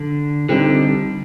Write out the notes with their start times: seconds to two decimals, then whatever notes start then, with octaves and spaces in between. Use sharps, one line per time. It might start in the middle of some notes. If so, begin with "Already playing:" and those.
Already playing: D3
0.49 D3 G3 C4 D#4